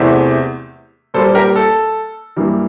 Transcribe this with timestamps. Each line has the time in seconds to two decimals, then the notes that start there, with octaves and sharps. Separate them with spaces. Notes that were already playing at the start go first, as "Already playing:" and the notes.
Already playing: E2 C3 E3 A3 C5 E5
1.14 A#2 G3 A#3 A4 C5
1.35 G4 A#4
1.56 A4
2.37 G2 E3 G3 A#3